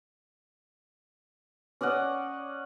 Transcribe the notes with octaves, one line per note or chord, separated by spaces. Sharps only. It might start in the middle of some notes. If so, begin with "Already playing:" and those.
C#4 D5 D#5 F#5